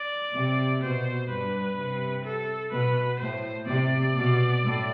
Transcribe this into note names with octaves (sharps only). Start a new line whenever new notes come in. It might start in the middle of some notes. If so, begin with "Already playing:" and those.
Already playing: D5
C3
B2 C5
G2 B4
C3
A4
B2 B4
A2 C5
C3 D5
B2
A2